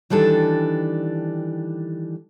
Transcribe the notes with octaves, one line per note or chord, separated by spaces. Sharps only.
D#3 E3 G3 D4 A4